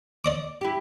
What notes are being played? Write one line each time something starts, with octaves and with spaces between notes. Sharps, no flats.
D5 D#5 D6
E4 G4